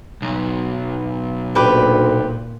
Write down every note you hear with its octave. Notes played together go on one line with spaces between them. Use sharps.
B1
D2 A#2 G4 B4 D6